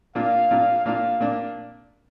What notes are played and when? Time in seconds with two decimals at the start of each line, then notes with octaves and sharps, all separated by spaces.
0.15 A#2 A#3 D4 F4 F5
0.51 A#2 A#3 D4 F4
0.85 A#2 A#3 D4 F4 F5
1.20 A#2 A#3 D4